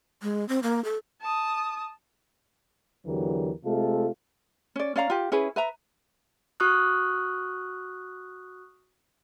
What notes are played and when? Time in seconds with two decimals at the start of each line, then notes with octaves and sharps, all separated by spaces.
0.22 G#3
0.49 C4
0.63 A#3
0.85 A4
1.22 A5 D#6
3.06 E2 D3 E3 F#3 G4 A#4
3.65 C3 G#3 A3 F4 A4
4.76 C#4 D5
4.96 C#4 D5 F5 A#5
5.10 F4 G4
5.32 C#4 E4 G#4 B4
5.56 B4 E5 A#5
6.60 F#4 C#6 D#6 F6 F#6